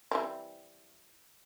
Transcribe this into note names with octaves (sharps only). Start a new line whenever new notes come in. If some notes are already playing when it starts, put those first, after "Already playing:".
E3 G3 C4